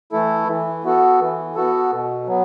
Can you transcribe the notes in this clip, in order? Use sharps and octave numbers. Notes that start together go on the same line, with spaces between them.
E3 A3 E4 A4
E3
B3 F#4 A4
E3
B3 F#4 A4
B2
F#3 B3